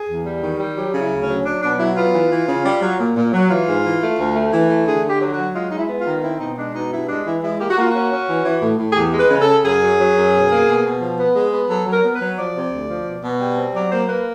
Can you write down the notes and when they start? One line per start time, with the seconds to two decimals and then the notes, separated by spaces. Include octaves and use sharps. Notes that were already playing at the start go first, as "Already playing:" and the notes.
Already playing: G#4
0.09 E2
0.26 G3
0.43 D#3
0.60 G3
0.77 F#3 G4
0.94 C#3
1.00 E4
1.11 D2
1.23 C#4
1.28 F#3
1.45 F#3 D4
1.62 B2 D4
1.79 F#3 E4
1.97 B3 F4
2.13 E3
2.31 E3
2.48 C#3
2.65 G3
2.82 F#3
2.99 A#2
3.16 A#2
3.33 F#3
3.50 E3 F4
3.67 G#2
3.84 E3
4.02 A3
4.18 D2
4.36 A3
4.52 E3
4.70 A3
4.87 D3 G#4
5.04 D3
5.09 G4
5.21 F#3
5.32 F#4
5.38 F#3
5.55 G#3 F4
5.70 G#3 D#4
5.78 E4
5.89 B3
6.01 F4
6.06 D#3
6.23 C4 E4
6.40 B2 D#4
6.57 G#3 D4
6.75 B2 D#4
6.92 G2 E4
7.09 G#3 D4
7.26 E3 E4
7.43 G#3 E4
7.60 A#3 G4
7.70 F#4
7.77 A#3 F4
7.92 C#4 F#4
8.11 C#4
8.28 E3
8.45 E3
8.62 A2
8.79 A2
8.92 G#4
8.96 E2 G4
9.13 G#3
9.19 B4
9.30 C#3
9.42 A4
9.48 C#3
9.65 F#2 G#4
9.82 F#3
9.99 F#3
10.16 F#2
10.33 B2
10.50 A#3
10.67 B2
10.84 B2
11.01 F3
11.18 B3
11.35 G#3
11.52 B3
11.69 F#3 A4
11.87 F#3
11.92 A#4
12.04 B3
12.15 B4
12.21 F#3
12.38 F3 D5
12.55 C3
12.72 D2
12.89 F3
13.06 B2
13.23 B2
13.40 G3
13.57 C4
13.74 F#3 D5
13.91 A#3 C5
14.08 A#3 B4